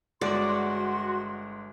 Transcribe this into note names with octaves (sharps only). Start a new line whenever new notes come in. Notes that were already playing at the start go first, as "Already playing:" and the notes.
G1 G#3 F#4 D5 C6